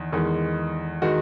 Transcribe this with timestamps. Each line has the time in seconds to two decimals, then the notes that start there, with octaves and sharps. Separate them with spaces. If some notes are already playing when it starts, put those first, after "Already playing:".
Already playing: E2 D#3
0.12 E2 D#3 G#3
1.02 D#3 G#3 F#4